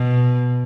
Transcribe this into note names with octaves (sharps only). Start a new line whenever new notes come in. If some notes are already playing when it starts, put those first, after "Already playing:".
Already playing: B2